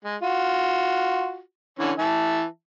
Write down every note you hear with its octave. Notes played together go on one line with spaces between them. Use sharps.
G#3
F4 F#4
D3 E3 C#4
E3 E5 A5